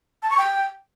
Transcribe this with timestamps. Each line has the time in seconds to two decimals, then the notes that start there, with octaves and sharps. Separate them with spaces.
0.23 A5
0.30 C#6
0.38 G5